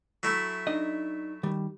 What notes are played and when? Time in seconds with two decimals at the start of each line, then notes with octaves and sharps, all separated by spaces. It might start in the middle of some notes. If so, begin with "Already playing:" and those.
0.23 F#3 A3 E4
0.67 D4 D#4 D#5
1.43 D#3 G3